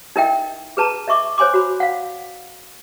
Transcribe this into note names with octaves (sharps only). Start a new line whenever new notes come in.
D#4 E4 A#4 D#5 E5 G5
G#4 B4 A5 A#5
D#5 E5 C#6 D6
C5 C#5 G#5 C6 D6
F#4 B5
F5 F#5